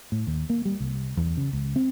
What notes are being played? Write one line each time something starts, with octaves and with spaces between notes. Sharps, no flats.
A2
D#2
A#3
G3
C2
E2
C#3
C#2
C4